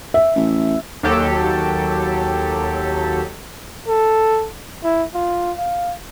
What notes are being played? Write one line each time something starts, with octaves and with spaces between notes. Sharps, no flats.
E5
A1
D#2 F#3 G4 A4
A4
E4
F4
F5